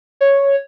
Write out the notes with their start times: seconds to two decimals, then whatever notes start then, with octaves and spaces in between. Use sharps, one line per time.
0.21 C#5